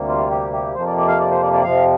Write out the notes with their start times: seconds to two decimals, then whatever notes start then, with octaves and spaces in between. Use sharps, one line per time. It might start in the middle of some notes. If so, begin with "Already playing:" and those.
Already playing: D2 C3 G3 A#3
0.08 F4
0.30 G4
0.53 G4
0.74 F2 C3 F3 A#3 C5
0.86 D5
0.97 D5
1.08 F5
1.20 D5
1.31 C5
1.43 D5
1.53 D5
1.64 F2 C3 F3 F5